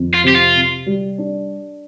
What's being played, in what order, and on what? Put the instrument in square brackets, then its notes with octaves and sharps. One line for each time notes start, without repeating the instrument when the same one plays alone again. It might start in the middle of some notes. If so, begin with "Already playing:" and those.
Already playing: [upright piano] F2
[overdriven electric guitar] F4
[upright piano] C3 [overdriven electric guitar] G4
[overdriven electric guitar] F4
[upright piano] C3
G3
D4